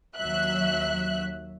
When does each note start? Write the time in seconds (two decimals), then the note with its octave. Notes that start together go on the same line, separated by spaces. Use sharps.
0.17 D#2 F#3 E5 F#6